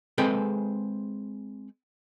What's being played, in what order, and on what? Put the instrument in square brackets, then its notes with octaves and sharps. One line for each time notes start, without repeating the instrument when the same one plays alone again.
[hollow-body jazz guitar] G#3 C4 G#4 A4 B4 G5